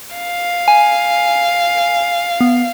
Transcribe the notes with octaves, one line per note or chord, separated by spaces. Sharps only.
F5
G#5
B3